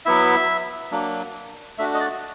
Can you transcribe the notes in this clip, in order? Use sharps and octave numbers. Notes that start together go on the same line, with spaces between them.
F#3 B3 E4 E5
F#3 A#3 D4
A3 D4 F#4 E5
D#5
D5